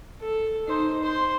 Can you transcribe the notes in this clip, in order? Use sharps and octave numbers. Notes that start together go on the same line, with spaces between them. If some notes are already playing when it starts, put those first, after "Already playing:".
A4
D#4 C5
C5 C6